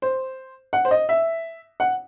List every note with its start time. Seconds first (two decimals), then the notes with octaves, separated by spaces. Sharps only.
0.02 C5
0.73 F#5
0.85 C5
0.91 D#5
1.09 E5
1.80 F#5